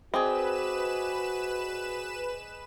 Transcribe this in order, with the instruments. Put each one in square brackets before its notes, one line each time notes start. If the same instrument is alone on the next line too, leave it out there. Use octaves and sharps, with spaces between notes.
[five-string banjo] C4 [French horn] F#4 [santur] G#4 D5 D#5 [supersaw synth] B4 E7